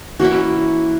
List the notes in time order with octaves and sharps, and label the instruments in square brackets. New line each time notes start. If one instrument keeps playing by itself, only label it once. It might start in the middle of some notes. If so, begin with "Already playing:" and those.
[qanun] E3 A#3 C#4 E4 [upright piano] F#4